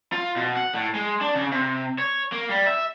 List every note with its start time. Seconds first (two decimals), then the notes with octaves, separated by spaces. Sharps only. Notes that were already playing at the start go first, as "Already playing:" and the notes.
0.12 F4
0.36 B2
0.57 F#5
0.74 A2
0.95 G#3
1.21 D4
1.35 C#3
1.52 C3
1.98 C#5
2.32 A#3
2.49 G3
2.66 E5